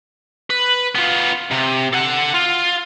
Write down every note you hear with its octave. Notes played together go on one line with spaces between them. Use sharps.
B4
B3 F4
C3
A4 F#5
F4